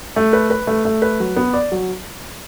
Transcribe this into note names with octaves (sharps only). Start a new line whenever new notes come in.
A3
B4
B4
A3
A3
B4
F#3
B3
D5
F#3